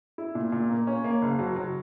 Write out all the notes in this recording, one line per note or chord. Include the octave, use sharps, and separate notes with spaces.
E4
A#2
A#2
A#3
C#4
A#3
F#1
F#3
F#3